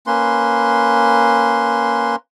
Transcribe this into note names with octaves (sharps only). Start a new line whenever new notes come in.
A#3 C#4 B4 C6